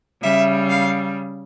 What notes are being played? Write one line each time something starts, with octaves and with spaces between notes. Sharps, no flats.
C#3 G3 E5
F5